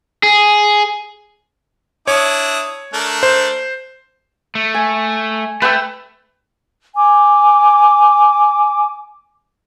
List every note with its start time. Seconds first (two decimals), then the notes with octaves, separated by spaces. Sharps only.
0.23 G#4
2.08 D4 E4 C#5 D#6
2.94 A3 D4 A#4
3.23 C5
4.55 A3
4.75 G#5
5.62 A3 B4 G5 E6
6.95 G#5 D6